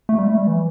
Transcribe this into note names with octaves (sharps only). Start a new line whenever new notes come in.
A3
G3
A3
G3
E3